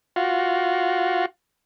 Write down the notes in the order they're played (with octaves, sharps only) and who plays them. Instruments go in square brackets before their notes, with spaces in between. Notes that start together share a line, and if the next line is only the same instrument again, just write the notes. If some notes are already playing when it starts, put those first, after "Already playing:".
[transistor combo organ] F4 F#4